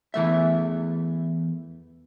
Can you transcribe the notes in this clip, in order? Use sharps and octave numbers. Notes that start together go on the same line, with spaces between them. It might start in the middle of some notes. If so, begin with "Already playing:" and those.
E2 E3 A3 E5